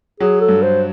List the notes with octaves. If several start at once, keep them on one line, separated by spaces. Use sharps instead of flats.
F#3 G#4
A4
G2
C5